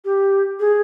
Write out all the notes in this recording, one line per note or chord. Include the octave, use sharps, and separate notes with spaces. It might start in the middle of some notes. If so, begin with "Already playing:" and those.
G4
G#4